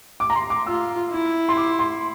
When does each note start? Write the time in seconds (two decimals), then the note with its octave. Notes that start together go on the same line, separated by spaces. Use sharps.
0.20 D6
0.30 A#5
0.35 C6
0.50 D6
0.66 F4 E6
1.11 E4
1.49 C6
1.57 D6
1.79 C6